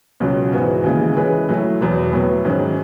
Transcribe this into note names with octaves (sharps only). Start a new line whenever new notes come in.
C#2 B2 F#3 C#4
G#2 E3 B3 F#4
D#2 C#3 E3 G#3
E3 G#3 C#4 G#4 B4
A2 F#3 A3 E4
E2 B2 F#3 B3
A2 F#3 B3
G#2 D#3 F#3 C#4